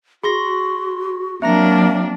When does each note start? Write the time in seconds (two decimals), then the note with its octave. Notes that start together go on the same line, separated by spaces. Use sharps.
0.23 F#4 G#4 B5 C6 A#6
1.42 F#3 A#3 C4 D4 E5 A#5 A#6